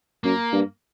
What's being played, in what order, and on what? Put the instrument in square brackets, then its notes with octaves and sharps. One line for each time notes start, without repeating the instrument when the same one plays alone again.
[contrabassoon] F#2 [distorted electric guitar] A#3
[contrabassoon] G2